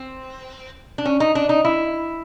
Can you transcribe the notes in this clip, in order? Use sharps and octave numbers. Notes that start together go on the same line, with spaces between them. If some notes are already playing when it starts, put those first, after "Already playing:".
Already playing: C4
D4
C#4
D#4
D4
D#4
E4